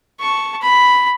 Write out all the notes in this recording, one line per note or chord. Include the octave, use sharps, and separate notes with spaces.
A5 C#6
B5